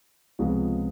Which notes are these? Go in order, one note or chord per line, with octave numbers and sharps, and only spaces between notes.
C#2 C3 F3 G#3 B3